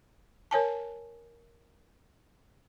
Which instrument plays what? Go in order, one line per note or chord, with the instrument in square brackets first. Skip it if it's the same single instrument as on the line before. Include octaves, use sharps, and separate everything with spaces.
[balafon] A#4 C#5 G#5 A5